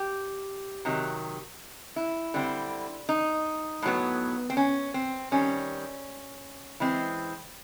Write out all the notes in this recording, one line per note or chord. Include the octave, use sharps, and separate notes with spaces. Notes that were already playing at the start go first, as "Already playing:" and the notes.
Already playing: G4
C3 D#3 F#3
E4
D3 G3 C4
D#4
A2 F#3 B3
C4
C#4
C4
D#3 G3 C4 C#4
E3 G#3 C4